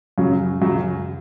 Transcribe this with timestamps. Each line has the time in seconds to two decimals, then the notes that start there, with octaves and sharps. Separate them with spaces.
0.18 F#2 C#3 F#3
0.61 F#2 C#3 F#3